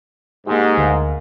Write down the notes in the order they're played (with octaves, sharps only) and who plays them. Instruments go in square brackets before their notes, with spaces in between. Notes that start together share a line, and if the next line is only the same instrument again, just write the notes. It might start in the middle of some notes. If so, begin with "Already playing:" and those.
[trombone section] G#2 [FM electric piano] A#3 G4
[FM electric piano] D2 A#4 F5